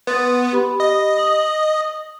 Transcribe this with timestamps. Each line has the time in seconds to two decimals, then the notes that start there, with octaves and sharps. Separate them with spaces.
0.07 B3 C6 D#6 A6
0.53 G4 B5
0.80 D#5
1.17 D#6 F#7